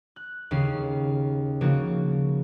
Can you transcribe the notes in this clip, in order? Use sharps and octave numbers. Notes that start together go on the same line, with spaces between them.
F#6
D#2 C#3 C#4 C7
C#3 F3 A#3 F#4